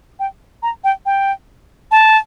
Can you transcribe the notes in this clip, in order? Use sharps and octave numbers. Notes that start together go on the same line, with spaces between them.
G5
A#5
G5
G5
A5